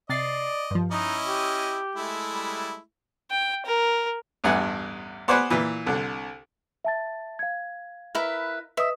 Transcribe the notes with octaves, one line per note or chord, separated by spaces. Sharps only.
C3 D5 D#5 A6 C7
G2 F3
C#4 D#4 E4 D#5
G4
G#3 A3 E4
G3
G5
A#4
A1 E2 G2 F#5 G#5
B3 C5 D5 F#5 G#5 B5
A#2 E3
C2 D3
E5 A5 A6
F5 G#6
E4 A#4 B4
B4 D#5 E5 D#6